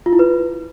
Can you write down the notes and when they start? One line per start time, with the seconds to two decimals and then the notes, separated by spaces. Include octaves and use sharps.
0.06 F4
0.13 E4
0.19 B4